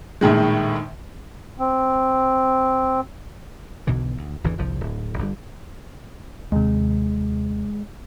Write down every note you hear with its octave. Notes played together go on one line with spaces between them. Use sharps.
A#1 A2 D#3 G#3
C4
B1 B2 D3 E3
D2
G#1 E2 D3 E3
G1 C2 F3
D1
G1 D3 E3 G3
D#2 C3 G#3